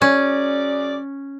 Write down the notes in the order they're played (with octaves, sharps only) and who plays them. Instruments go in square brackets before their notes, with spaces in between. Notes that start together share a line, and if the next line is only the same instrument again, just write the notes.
[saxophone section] F#2 G#4 D5 [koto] C#4